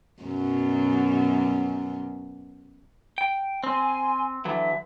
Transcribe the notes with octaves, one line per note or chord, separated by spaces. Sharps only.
F#2 B2 F#3
G5
C4 G#5 C6
D3 E3 F#3 E5